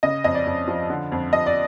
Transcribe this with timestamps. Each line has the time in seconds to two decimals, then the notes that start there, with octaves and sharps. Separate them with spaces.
0.03 C#3 D#5
0.24 F2 D#5
0.35 D5
0.46 F2
0.68 F3
0.90 D3
1.12 F2
1.33 F2 D#5
1.46 D5